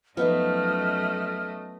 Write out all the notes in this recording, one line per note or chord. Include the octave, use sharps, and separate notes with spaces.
F#2 F3 A3 B3 D#4 D#5 F5 F6